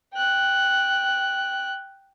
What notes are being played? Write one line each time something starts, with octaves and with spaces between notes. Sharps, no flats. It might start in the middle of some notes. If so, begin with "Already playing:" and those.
G5 F#6